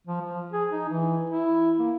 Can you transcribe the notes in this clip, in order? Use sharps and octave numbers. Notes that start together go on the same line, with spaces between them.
F3
F3
G#4
D#4
E3
E4
A#3